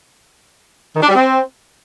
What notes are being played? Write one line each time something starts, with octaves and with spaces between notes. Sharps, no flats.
D#3
D4
G3
C4